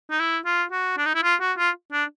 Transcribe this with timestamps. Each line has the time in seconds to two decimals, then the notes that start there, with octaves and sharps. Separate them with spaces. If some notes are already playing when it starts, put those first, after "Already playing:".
0.10 D#4
0.20 E4
0.45 F4
0.72 F#4
0.97 D4
1.06 D#4
1.15 E4
1.23 F4
1.41 F#4
1.58 F4
1.92 D4